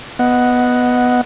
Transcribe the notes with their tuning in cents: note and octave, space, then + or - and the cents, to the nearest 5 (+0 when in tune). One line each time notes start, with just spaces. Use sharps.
B3 +0 D#5 +0 F#5 +0